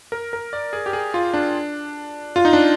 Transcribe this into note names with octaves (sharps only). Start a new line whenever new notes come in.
A#4
A#4
D5
G#4
G4
G#4
F4
D4
F4
D#4
D4